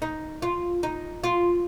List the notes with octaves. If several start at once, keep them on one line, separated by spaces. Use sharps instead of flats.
D#4
F4
D#4
F4